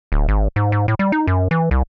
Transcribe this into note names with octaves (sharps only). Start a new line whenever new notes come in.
D1
G#1
G#2
G#2
A2
G3
D#4
F#2
E3
C2